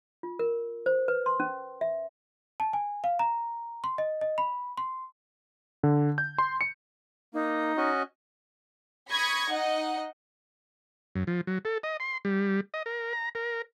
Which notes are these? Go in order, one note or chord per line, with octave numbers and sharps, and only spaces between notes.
F4
A#4
C5
B4
C6
C#4
E5
A5
G#5
F5
A#5
C6
D#5
D#5
B5
C6
D3
G6
C6
C#7
A#3 D#4
C#4 F#4 D#5
B5 C#6 D#6 G#6 A#6 C#7
D#4 D#5 F#5
F#2
F3
F#3
A4
D#5
C6
G3
D#5
A#4
A#5
A#4